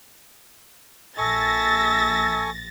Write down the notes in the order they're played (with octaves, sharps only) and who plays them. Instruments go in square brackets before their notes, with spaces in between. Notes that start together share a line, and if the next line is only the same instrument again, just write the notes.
[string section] A#1 A6 A#6 [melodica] A4 G#5 C#6 [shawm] E5